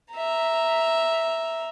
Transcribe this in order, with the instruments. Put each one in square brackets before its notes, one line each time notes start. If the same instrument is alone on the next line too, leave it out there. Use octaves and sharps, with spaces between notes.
[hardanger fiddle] E5 A#5